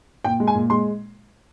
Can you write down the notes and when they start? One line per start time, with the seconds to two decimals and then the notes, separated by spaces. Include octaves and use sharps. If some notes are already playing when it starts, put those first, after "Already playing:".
0.24 A#2 G5
0.40 G#3
0.47 G#5
0.55 A#2
0.70 G#3 C6